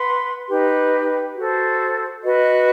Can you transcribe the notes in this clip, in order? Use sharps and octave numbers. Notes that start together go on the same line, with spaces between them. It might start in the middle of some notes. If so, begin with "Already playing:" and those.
Already playing: B4 F#5 C6
D#4 G4 B4
F#4 A4 C5
F#4 B4 D#5